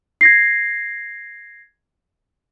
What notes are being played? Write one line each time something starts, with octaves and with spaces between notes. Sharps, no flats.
G#6 A#6 C7